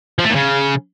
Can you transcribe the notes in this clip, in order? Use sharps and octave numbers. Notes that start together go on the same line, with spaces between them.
F3
A3
A#2
C#3